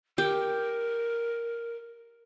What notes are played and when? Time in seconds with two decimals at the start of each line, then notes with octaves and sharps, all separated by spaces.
0.18 G4 A#4